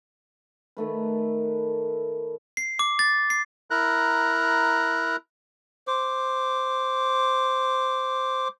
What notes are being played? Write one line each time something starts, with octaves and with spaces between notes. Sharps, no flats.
D#3 A3 B4
C7
D6
A6
C7
E4 A#4 A#5 F#6
C5 D6